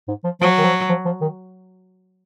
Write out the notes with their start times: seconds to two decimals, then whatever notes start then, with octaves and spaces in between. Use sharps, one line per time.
0.08 G#2
0.24 F3
0.41 F3 F#3
0.58 D#3
0.65 F3
0.89 F3
1.05 F3
1.21 D#3